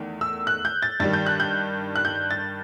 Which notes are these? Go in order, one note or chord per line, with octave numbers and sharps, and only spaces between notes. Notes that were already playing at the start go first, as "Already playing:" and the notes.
Already playing: E2 D#3 A3
E6
F#6
G6
A6
G2 D#3 G3 A6
G6
F#6
G6
F#6
G6
A6